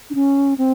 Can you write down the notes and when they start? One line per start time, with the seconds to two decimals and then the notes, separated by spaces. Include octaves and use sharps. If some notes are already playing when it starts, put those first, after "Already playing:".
0.10 D4
0.15 C#4
0.58 C4